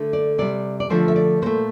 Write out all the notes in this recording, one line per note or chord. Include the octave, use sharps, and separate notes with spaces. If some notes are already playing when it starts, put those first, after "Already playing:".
Already playing: D3 A3
D5
C3 G3 D5
D5
D3 F3 A3 C5
E5
D5
A#2 A3 C5